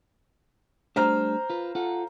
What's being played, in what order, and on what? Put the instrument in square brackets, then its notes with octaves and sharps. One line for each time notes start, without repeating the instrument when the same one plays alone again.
[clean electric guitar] G3 A3 D4 [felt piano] C5 A#5 F6
[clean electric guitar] F4 B4
F4 A4 F#5